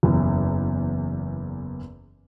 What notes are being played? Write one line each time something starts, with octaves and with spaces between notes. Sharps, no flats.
F#1 E2